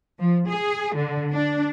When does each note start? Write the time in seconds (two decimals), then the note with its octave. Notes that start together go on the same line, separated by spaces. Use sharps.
0.19 F3
0.49 G#4
0.96 D3
1.32 D4